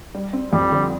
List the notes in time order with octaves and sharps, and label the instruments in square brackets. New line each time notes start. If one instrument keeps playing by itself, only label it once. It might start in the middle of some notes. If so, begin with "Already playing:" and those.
[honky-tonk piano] G3
C4
[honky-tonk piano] F2 [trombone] G3
[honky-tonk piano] D3